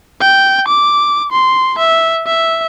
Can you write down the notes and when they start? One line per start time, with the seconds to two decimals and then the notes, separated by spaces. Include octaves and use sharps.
0.20 G5
0.68 D6
1.32 C6
1.78 E5
2.26 E5